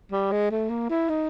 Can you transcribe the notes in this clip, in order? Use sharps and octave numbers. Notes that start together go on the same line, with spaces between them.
G3
G#3
A3
A#3
E4
D#4